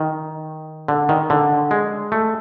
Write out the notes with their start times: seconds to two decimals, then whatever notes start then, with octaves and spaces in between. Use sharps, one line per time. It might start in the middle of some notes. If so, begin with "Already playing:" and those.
Already playing: D#3
0.88 D3
1.09 D#3
1.30 D3
1.71 G#3
2.12 A3